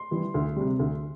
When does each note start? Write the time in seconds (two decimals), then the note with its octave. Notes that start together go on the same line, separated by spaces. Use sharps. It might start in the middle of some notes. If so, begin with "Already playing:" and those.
Already playing: C6
0.11 E3 G3 E4
0.34 D2
0.56 C3 G3
0.79 D2